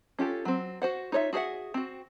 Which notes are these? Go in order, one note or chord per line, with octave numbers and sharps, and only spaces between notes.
C#4 F4 G4 A4
F#3 C4
F#4 C5 F#5
D#4 F4 C#5 D#5 E5
F#4 G#4 A#4 E5 F#5
C4 F#4